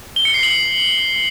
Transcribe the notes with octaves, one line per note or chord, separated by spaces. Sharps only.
G7
C#7
C7
F#7